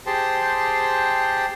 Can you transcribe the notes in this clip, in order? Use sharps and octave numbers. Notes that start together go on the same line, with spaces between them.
G4 G#4 C5 G5 A5 C6